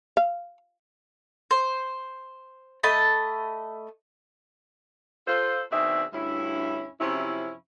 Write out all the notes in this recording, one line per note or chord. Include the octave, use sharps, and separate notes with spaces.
F5
C5
A3 D#5 A5 B5
F4 A4 C5
B2 D#3 C4 D4 G#4 E5
D2 G2 C#4 E4
F#2 C3 F3 C#4 E4